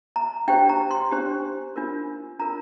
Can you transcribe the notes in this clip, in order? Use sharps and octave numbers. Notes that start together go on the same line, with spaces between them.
A#5
D4 G4 C5 G5
A#5
C6
D4 G4 C5
D4 F4 A#4
D4 F4 A#4 A#5